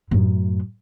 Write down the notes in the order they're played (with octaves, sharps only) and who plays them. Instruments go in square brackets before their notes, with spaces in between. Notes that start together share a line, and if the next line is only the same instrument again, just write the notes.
[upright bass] F#2 A2